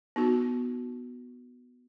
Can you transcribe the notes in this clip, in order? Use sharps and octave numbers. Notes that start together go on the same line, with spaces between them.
B3 D#4 F#4